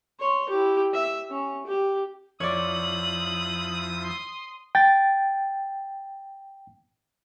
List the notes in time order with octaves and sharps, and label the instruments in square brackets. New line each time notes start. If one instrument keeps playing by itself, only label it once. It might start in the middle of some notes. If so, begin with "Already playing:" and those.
[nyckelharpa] C#5 C6
E4 G4
E5
C#4
G4
[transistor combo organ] F2 F3 E4 [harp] C#5 D5 [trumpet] D#6 [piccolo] F#7
[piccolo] C6
[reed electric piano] G5 A6